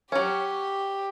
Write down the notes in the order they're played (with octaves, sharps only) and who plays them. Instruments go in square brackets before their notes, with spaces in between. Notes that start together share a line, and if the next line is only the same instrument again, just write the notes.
[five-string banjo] F#3 C#4 [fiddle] G4